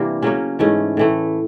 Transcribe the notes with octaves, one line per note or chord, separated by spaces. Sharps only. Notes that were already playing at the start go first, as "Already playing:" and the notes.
Already playing: G2 C3 E3 G3 A#3 D4
C#3 F#3 A#3 C#4
G#2 E3 A3 C#4
A2 E3 A3